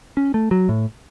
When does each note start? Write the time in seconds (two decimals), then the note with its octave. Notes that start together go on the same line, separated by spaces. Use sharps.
0.17 C#4
0.34 A3
0.51 F#3
0.69 A2